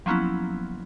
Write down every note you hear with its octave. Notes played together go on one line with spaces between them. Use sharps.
F3 F#3 A#3 B3 C#4 E4